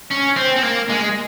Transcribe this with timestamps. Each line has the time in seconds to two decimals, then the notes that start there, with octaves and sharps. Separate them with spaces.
0.11 C#4
0.36 C4
0.56 C4
0.63 A#3
0.89 G#3